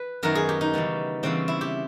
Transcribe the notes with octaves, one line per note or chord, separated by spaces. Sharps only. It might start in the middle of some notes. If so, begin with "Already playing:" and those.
Already playing: B4
F#2 D#3 F#3 B3 A#4
G#4
G4
D#4
C#3 E3 G3 B3
C#3 E3 G3 B3 C4
E4
G4